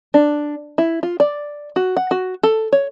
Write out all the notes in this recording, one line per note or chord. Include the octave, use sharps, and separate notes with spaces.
D4
E4
F4
D5
F#4
F#5
F#4
A4
C#5